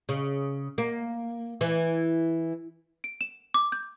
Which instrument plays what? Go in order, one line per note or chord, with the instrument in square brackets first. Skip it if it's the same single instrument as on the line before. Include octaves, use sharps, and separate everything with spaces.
[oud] C#3
A#3
E3
[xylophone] D7
E7
D6
G6